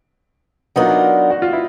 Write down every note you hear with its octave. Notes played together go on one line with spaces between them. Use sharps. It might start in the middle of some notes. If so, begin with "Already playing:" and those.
F#3 B3 D4 D#4 F4 A#4
F#4
F4
E4